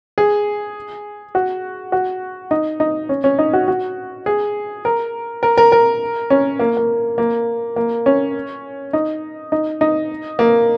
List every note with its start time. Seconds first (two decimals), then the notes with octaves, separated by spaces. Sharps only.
0.18 G#4
1.35 F#4
1.92 F#4
2.51 D#4
2.80 D#4
3.09 C#4
3.24 C#4
3.39 D#4
3.53 F#4
3.68 F#4
4.26 G#4
4.85 A#4
5.43 A#4
5.57 A#4
5.72 A#4
6.30 C#4
6.59 A#3
6.77 A#3
7.18 A#3
7.76 A#3
8.06 C#4
8.93 D#4
9.52 D#4
9.81 D#4
10.39 A#3